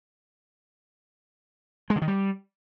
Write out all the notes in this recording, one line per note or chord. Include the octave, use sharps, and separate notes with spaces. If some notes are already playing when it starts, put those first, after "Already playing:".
G#3
D3
D#3
G3